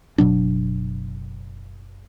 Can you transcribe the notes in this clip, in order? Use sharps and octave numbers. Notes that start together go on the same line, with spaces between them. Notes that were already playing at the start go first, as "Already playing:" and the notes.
F#1 B2 F#3 D4